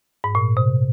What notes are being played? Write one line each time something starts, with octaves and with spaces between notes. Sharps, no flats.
G#2
A#2
C3